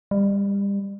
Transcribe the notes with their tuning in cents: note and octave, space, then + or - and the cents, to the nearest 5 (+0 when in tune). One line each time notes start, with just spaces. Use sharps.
G3 +30